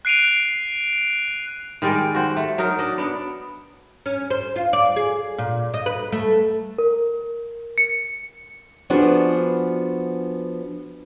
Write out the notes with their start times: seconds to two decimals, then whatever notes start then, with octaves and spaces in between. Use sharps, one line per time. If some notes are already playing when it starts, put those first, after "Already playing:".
0.05 F#6 C7 D7 D#7 F7
1.82 D#3 G3 G#3 D5
2.15 F#4 C5 F#5
2.36 A3
2.58 F#3 D#4 A#4
2.79 D4 D#5
2.98 B3 D4
4.06 C#4
4.30 C5
4.56 F4
4.73 D5
4.96 G#4
5.38 A#2
5.74 D#5
5.86 B4
6.12 A3
6.78 A#4
7.78 C#7
8.90 F3 B3 D4 F#4 G#4 B4